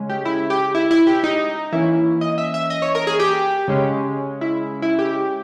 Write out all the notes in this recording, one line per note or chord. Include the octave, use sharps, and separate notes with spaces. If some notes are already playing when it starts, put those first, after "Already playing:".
Already playing: C#3 G#3 C#4
G4
E4
G4
E4
E4
G4
D#4
E3 A#3 C#4 E4
D#5
E5
E5
D#5
C#5
A#4
G#4
G4
C#3 G#3 C#4
E4
E4
G4